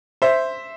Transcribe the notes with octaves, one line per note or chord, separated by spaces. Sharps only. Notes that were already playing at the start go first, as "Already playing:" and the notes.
C5 E5